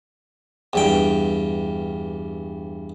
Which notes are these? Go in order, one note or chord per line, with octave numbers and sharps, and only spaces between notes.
E2 G2 G5